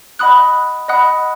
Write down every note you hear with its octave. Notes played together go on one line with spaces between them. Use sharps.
D#5 F#5 B5 D#6 F#6
D#5 F#5 B5 D#6 F#6